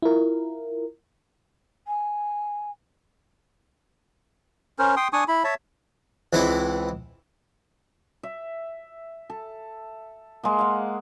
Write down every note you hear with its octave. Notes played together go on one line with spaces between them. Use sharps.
E4 F4 A#4
G#5
C#4 A#4 C5
G5 C6 D#6
D4 G#5 C#6 D#6
E4 B5
C#5 E5 A5
C#2 E3 C4 E4
E5
A4
G#3 A#3
F5 F#5